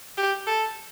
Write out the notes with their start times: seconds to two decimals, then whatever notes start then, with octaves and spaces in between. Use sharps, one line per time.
0.18 G4
0.47 A4